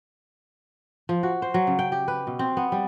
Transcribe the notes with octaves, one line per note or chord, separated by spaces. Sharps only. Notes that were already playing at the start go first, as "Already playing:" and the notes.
F3
F#4
C5
F#3
C#3
G5
G4
B4
B2
C4
B3
G3